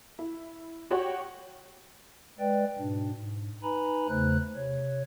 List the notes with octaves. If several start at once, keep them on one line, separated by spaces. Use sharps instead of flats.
E4
F#4 G4 C#5 F#5 G5
G#3 B4 D5 G5
G#2 B2 D4
G#2
D#4 B4 G#5 A#5 B5
E2 C#3 A3 C5 F#6
C3 C#5